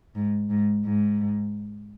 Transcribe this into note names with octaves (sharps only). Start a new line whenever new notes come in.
G#2
G#2
G#2